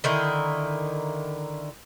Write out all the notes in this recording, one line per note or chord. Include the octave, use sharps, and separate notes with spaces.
D3 D#3 D#4 E4